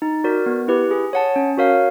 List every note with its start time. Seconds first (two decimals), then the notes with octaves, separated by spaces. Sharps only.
0.02 D#4
0.24 F#4 A#4 D5
0.46 B3
0.68 E4 G4 B4
0.91 G#4
1.13 C#5 F#5 A5
1.36 C#4
1.57 F#4 A#4 C#5 F5